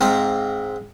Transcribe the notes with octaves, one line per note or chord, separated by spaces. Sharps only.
G#2 C4 F5 A#5